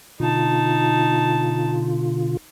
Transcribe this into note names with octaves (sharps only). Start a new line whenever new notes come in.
B2 D3 D#4 F4 A5